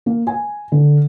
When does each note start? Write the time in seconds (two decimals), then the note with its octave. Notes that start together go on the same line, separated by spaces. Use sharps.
0.06 A#3
0.27 G#5
0.72 D3